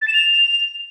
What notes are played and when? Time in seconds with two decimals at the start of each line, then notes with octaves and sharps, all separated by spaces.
0.02 A6
0.08 E7
0.14 F7